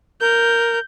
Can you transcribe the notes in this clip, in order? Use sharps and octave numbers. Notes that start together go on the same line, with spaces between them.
A#4 G6